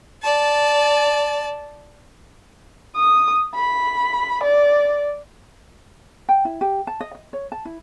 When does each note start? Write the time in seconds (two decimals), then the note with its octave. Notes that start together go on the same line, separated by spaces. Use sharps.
0.23 D5 A5
2.96 D#6
3.54 B5
4.43 D5
6.29 G5
6.45 E4
6.61 G4
6.87 A5
7.00 D#5
7.15 D#5
7.33 C#5
7.52 A5
7.65 E4